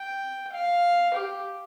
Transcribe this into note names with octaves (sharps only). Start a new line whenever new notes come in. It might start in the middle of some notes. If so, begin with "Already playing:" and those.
Already playing: G5
F5
G4